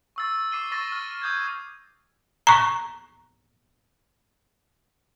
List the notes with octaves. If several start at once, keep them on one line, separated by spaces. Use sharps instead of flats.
C#6 E6 A6
D6 C7 D#7 G7
C#6 E6 A6 A#6 D#7
F6
D#6 G6 G#6
A#5 C#6